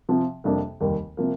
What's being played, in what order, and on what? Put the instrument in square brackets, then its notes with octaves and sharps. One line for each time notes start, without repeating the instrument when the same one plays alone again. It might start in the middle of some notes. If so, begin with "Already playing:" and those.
[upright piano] C3 F3 C4
F2 C3 G3 A#3 D4
F1 D#2 D#3 G3
C3 F3 A#3